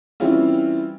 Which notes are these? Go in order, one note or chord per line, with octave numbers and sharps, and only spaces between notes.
E3 G3 C4 C#4 E4 F4